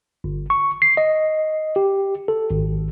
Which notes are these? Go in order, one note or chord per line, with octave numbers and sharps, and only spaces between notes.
G1
C#6
C7
D#5
G4
A4
G#1